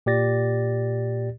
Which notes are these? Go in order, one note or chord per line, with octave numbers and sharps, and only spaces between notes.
A#2 G4 D5 A6 A#6